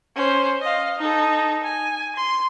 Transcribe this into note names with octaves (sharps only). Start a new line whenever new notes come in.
C#4 C5
D#5 F5
D#4 A4
G#5
C6